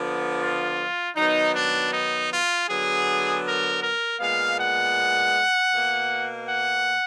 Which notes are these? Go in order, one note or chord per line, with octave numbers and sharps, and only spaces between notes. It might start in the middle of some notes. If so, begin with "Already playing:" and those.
Already playing: D3 F3 B3
F4
D#3 F#3 B3 D#4
D4
D#4
F4
D3 F#3 B3 G#4
A#4
A#4
A#2 G#3 B3 F5
F#5
B2 A#3
F#5